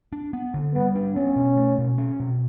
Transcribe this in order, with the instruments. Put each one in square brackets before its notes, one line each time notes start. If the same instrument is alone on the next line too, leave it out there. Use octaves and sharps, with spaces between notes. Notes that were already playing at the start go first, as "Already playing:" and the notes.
[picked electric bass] D4
B3
D3
[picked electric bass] G3 [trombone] B3
[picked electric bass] D4
[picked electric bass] B3 [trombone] C#4
[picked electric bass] B2
A3
B2
C#4
B2